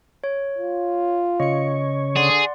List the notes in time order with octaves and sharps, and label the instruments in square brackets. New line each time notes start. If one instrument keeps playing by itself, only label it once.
[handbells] C#5
[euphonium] F4
[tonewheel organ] C#3 C#5 [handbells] D#5 C#7
[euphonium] D3 [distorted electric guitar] G#4 [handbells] D5 F#5 C6